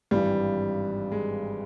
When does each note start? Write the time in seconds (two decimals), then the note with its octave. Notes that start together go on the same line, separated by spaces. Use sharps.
0.11 G#1 G2 E3 G3
1.12 G#3